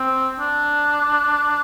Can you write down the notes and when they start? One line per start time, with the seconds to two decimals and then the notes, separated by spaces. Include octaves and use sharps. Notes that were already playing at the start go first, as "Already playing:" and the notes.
Already playing: C4
0.39 D4